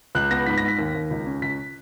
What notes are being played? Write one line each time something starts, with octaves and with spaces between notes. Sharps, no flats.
C#2 F#6
B3 A#6
G#2 B6
A#6
G#2
B6
D#2
D#2
C#2
C#4
C#2 B6